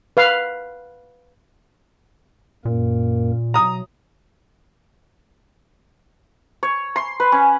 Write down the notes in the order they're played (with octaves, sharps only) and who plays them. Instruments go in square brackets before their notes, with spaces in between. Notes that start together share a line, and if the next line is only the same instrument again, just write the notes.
[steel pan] B4 F5
[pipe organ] F#2 A#3 A#4 [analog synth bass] A#2
[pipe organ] B2 F#3 [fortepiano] A#5 D#6
[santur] C#5
C6
B4
C#4